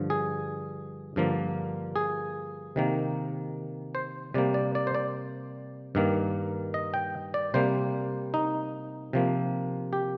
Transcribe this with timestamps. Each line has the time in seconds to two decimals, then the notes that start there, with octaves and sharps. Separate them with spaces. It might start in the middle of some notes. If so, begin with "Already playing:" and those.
Already playing: G2 D3 F3
0.10 G#4
1.16 G2 D3 F3 A#3
1.96 G#4
2.76 C3 D#3 A#3
3.95 C5
4.34 C3 G3 A#3 D5
4.54 D5
4.75 D5
4.87 C5
4.95 D5
5.95 G2 D#3 A#3
6.74 D#5
6.94 G5
7.34 D5
7.54 C3 G3 A#3 C5
8.34 D#4
9.13 C3 F3 A#3
9.93 G4